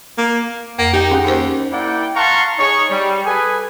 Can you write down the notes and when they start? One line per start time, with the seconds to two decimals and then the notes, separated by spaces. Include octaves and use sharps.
0.18 A#3
0.79 F2 A#3
0.94 D#4 G4 G5
1.11 C#4 G#4 F#5
1.25 D#2 C#4 C5
1.71 A#3 E4 D5 F#5 G5
2.15 F5 F#5 A5 A#5 C6 C#6
2.58 D#4 G#4 C#5 C#6
2.90 G3
3.25 G#4 A4 B4 G#5